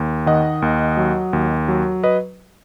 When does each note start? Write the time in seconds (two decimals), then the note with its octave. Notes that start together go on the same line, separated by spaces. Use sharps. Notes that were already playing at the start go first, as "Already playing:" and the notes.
Already playing: D#2
0.26 D#3 D#5 F#5
0.62 D#2
0.97 F#3
1.33 D#2
1.68 F#3
2.04 B4 D#5